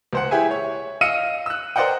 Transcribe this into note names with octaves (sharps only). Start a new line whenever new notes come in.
C#2 C5 F#5
E4 G4 G#4 E5 G#5
C#5
D#5 F5 E6 F6 C#7 D#7
E6 F#6
A#4 C5 D5 D#5 F#5 G5